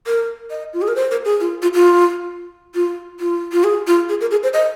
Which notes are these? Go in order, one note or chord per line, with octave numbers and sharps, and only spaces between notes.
A#4
D#5
F4
G#4
A#4
C5
A#4
G#4
F4
F4
F4
F4
F4
F4
G#4
F4
G#4
A#4
G#4
C5
D#5